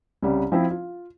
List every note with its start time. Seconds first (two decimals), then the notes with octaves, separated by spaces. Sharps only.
0.23 C2 C#3 G3
0.52 F3 C4 E4
0.71 F4